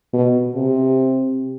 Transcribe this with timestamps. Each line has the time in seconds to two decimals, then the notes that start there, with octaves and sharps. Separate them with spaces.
0.14 B2
0.56 C3